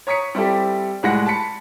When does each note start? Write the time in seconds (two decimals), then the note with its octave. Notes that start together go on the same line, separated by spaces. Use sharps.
0.07 C#5 A#5 D#6 B6 C#7
0.35 G3 C4 E4 G4 A4 D5
1.03 C2 A2 G#3 F#5 A#6 C#7
1.26 A5 B5 B6 C#7